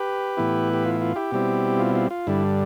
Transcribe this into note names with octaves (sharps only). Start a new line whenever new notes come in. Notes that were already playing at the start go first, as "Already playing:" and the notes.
Already playing: G4 B4
A2 E3 B3 E4
G4
F4
F4
E4 G4
B2 G3 C4 E4
F4
F4
F4
G2 D3 G3 E4